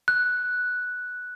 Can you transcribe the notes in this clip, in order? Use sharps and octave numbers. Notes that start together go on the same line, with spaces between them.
F#6